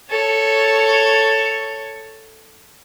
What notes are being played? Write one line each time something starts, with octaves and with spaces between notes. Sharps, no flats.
A4 C#5